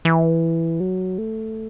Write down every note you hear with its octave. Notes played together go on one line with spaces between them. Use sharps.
E3
F#3
A3